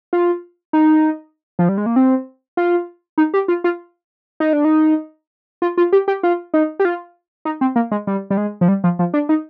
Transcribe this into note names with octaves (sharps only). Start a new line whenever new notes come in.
F4
D#4
F3
G3
G#3
A#3
C4
F4
D#4
G4
F4
F4
D#4
D4
D#4
F4
F4
G4
G4
F4
D#4
G4
F4
D#4
C4
A#3
G#3
G3
G3
G#3
F3
G3
F3
F3
D4
D#4